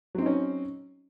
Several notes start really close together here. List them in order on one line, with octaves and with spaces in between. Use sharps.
F#3 C4 D#4 C#4